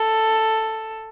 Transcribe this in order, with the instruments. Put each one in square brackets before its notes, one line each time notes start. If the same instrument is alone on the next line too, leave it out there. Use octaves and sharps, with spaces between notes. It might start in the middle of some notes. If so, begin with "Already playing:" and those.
Already playing: [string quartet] A4